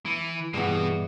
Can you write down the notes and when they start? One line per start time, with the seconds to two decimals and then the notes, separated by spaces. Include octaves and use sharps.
0.06 E3
0.54 G2 B2 E3 F#4 G#4 F#5